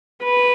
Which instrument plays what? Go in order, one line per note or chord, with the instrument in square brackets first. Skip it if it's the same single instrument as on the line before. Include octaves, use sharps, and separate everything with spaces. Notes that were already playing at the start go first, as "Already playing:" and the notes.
[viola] B4